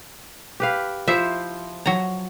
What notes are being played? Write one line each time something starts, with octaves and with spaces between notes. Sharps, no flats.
G4 B4 F5
F3 E4 C5 E5
F#3 A#5